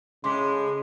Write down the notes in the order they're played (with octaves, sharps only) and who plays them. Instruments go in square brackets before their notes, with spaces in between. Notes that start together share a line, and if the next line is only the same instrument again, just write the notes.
[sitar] A2 G#3 [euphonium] C#3 [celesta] C6 D6 B6